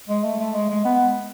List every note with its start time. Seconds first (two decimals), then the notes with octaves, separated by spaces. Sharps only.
0.09 G#3
0.24 A3
0.40 A3
0.55 G#3
0.70 G#3
0.85 B3